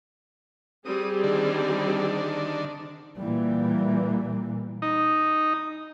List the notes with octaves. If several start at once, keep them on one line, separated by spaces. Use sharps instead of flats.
G3 C4 G#4 D#6
D3 D#3 D4
A#2 E3 G3 A#3
D#4